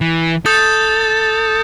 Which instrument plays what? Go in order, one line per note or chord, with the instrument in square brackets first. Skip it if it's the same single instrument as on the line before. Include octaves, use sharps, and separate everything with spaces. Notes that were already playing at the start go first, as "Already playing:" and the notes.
[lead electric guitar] E3
[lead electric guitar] A4 [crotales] D#6 G6 A6